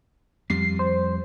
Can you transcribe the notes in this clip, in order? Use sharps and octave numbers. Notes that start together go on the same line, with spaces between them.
F2 G3 C7
C5